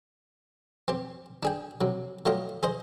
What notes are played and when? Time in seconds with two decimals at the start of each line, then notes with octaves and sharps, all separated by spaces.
0.88 C4 G4
1.43 D4 G#4 G5
1.81 C3 F#3
2.26 F#3 A3 F4 G4 D#5
2.63 G#4 C5 D#5